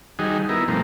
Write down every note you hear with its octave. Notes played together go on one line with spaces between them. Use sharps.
D#3 G3 D#4 F#4 G#4
B3 D#4 E4 A#4
B2 F3 G3 A3 A#3 C4